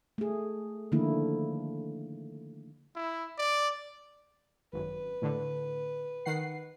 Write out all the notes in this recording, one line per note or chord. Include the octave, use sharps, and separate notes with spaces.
A3 G#4
D3 D#3 F3 A3 A#3 E4
E4
D5
G#1 F#2 B4
A2 D3
D#3 F#5 C7